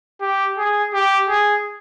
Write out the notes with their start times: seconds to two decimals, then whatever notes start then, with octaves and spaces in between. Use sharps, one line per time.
0.21 G4
0.58 G#4
0.94 G4
1.29 G#4